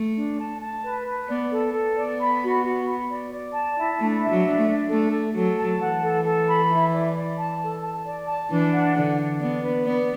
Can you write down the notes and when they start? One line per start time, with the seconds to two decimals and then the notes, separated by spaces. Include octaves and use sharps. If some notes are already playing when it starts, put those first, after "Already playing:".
Already playing: A3
0.15 D4
0.38 A5
0.61 A5
0.83 B4
1.06 B4
1.28 B3 D5
1.51 A4
1.73 B3 A4
1.96 D5
2.19 B5
2.41 F#4
2.63 F#4
2.86 B5
3.08 D5
3.31 D5
3.54 A5
3.77 E4
3.99 A3 D4
4.21 E5
4.30 F#3
4.44 D4
4.59 A3
4.67 D4
4.89 A3 A4
5.12 A4
5.34 F#3 A4
5.57 A5
5.79 E3 F#5
6.02 A4
6.24 A4
6.47 B5
6.69 E4
6.92 D5
7.15 D5
7.37 A5
7.60 A4
7.82 A5
8.05 D5
8.28 A5
8.50 E3 D4
8.72 F#5
8.95 D3 D4
9.18 D4
9.40 B3 D5
9.63 B4
9.85 B3 D5